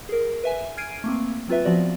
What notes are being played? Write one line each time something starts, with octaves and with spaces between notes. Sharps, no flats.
G#4 A#4
B4 E5 G#5
F6 G#6 C7 D7 D#7
A3 A#3 C4
F#3 C4 F4 B4 E5
F3 B3 C4 F4 F#4 D5